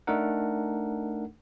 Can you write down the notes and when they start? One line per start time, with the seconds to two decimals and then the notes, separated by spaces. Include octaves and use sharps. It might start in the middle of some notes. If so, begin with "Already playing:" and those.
0.07 A3 D4 D#4 A4 A#4 F#5